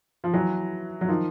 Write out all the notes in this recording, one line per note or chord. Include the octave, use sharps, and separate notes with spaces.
F3
E3 F#3
F#3
D#3 F3